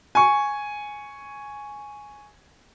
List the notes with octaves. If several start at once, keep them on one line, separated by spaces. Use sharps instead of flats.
G#5 C#6